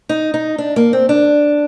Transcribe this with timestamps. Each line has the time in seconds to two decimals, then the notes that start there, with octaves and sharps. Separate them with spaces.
0.09 D#4
0.34 D#4
0.58 D4
0.76 A#3
0.93 C4
1.09 D4